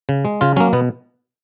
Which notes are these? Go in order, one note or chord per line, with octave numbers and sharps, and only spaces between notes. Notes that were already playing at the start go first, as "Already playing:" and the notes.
C#3
G#3
C#3 F4
F#3 A#3 C#4
B2 B3